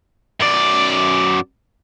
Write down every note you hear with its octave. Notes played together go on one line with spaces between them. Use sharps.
F#2 D5